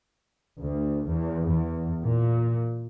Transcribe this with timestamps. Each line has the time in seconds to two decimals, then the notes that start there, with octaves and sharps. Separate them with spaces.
0.60 D2
1.06 E2
1.48 E2
2.04 A#2